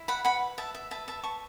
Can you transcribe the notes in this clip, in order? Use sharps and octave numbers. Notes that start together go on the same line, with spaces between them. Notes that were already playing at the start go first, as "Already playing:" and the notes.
Already playing: E4
F#5 B5
B4 F#5 B5
B4 E5 A5
E5
B4 E5 A5
E5 A5
B4 A5 C#6